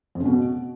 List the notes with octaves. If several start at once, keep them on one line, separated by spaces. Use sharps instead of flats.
F2
C#3
B2